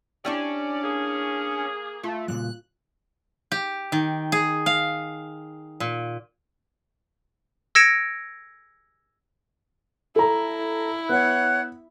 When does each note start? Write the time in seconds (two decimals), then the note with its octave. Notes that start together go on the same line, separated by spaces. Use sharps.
0.25 C#4 D4 E4 G4 D5
0.83 A#3 G#4
2.03 A3 F4
2.28 A#2 C#3 G3 F#6
3.52 G4
3.92 D#3
4.32 G#4
4.66 F5
5.80 A#2
7.75 E6 G#6 A#6 C#7 D7 E7
10.16 E4 A4 A#5
11.09 B3 C#5 F#5 F#6